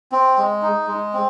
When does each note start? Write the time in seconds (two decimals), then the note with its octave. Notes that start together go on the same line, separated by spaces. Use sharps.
0.12 C4
0.38 G#3
0.62 D#4
0.87 G#3
1.14 C4